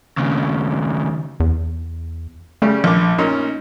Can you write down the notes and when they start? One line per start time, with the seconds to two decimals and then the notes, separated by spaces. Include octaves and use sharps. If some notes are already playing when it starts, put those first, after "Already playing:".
0.17 D#2 C#3
1.40 E2
2.62 C#3 G3 A3
2.84 A#1 D6
3.18 A#2 C#4 D#4